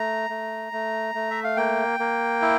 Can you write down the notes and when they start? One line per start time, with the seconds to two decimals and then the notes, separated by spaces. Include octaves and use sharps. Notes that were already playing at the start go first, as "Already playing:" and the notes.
Already playing: A3 A#5
0.30 A3
0.73 A3
1.15 A3
1.31 E5
1.44 F5
1.57 A#3 G5
2.00 A#3
2.42 E4